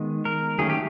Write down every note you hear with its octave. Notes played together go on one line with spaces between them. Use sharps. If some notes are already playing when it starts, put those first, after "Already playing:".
Already playing: D#3 G#3 B3
A#4
D#3 F#3 A3 C#4 G#4
G4